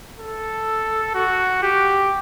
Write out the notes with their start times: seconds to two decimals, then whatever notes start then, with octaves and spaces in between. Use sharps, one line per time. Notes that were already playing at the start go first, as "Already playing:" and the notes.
0.19 A4
1.15 F#4
1.63 G4